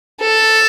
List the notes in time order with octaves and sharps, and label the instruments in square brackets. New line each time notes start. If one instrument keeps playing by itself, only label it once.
[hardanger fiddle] A4